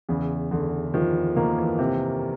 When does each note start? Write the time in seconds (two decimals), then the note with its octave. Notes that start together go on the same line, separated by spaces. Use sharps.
0.09 E2 C#3
0.51 E2 D3
0.94 D#3 F3
1.36 D#3 A#3
1.58 E3
1.79 C3